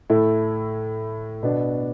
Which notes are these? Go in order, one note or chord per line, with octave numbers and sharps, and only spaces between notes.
A2 A3 E4
B2 B3 D4